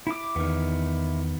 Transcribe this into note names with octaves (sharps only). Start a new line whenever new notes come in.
E4 D6
E2 D#3 B3